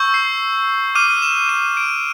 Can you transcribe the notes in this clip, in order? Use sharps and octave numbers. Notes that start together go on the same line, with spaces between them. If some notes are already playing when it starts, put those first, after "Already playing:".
Already playing: C#6 E6 G6
C7
D6 F6 D#7
E7
D#7
D7